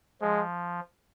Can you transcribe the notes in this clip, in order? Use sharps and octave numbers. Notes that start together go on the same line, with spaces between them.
F3 G#3